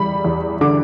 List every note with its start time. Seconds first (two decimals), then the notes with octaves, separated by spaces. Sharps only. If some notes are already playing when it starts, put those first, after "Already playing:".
Already playing: E2 G3 B5
0.24 E2
0.61 D3 D6